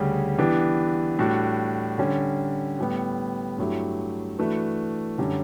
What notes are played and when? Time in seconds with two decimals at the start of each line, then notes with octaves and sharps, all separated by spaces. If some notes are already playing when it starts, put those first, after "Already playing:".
Already playing: D2 C#3 G3 C#4
0.38 E3 B3 D4 G4
1.19 A2 G3 D4 F#4
1.98 D3 G3 C#4
2.79 A2 G3 B3
3.58 G2 F#3 A3 E4 G4
4.39 E3 A3 D4 F#4 B4
5.18 F#2 D3 G3 C#4 G4